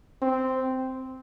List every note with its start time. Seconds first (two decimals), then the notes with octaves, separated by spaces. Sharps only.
0.22 C4